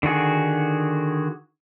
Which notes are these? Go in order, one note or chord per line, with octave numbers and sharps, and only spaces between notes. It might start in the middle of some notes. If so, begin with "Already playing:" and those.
D3 D#3 F#4 G#4